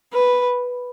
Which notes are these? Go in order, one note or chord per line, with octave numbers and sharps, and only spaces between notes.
B4